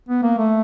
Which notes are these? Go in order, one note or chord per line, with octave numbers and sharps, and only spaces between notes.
B3
A#3
A3